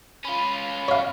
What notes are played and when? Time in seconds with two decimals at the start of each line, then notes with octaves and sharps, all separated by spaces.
0.25 C#4 F4 B5
0.88 C#5 F5